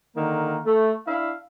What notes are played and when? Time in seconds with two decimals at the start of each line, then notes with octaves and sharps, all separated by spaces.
0.16 D3 D#3 A#3 A#4
0.66 A3
1.07 D4 E4 F5